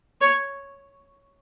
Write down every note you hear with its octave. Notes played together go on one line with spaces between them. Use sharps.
C#5